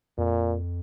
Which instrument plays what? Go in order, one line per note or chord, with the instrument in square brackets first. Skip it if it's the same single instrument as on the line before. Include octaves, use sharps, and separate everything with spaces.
[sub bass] F2 [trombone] A#2